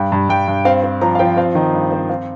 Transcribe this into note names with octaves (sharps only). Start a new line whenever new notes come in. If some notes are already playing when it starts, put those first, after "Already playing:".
Already playing: G2 G5
G2
G2 G5
G2
C4 F5
C4
F3 A#5
F5
F3 G5
C4 F5
D#3 D#5
G2 D#5
C4 C5
C4 F5